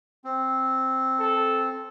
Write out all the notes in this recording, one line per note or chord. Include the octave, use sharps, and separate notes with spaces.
C4
A4